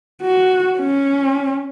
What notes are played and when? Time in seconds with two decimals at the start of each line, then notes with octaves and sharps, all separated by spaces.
0.22 F#4
0.79 C#4